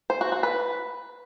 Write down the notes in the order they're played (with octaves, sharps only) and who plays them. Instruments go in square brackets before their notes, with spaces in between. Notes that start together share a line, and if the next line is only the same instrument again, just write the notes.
[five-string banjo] C5
F#4
F#4
B4